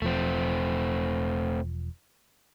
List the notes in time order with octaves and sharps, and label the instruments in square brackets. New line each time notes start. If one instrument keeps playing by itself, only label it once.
[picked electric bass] E1 F3 [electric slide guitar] A3 C4